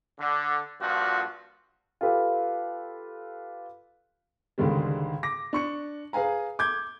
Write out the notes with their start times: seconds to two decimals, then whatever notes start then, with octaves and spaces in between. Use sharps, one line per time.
0.20 D3
0.80 G2 A#2 F3 F#4
2.01 F4 G4 A4 B4
4.58 C#2 G#2 D3 D#3 G3
5.23 D6 A#6
5.53 D4 C#6 C#7
6.13 G#4 B4 F5 G#5 A#5
6.59 D6 G6 G#6